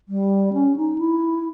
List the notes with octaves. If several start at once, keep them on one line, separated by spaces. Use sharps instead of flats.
G3
C#4
D#4
E4